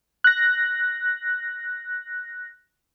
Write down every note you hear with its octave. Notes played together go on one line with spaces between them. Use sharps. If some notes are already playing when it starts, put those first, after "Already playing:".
F#6 A#6